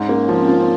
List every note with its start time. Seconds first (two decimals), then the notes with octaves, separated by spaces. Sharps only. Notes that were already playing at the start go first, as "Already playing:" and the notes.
Already playing: G#2 C#4
0.09 A#3
0.28 F3 C4
0.48 F4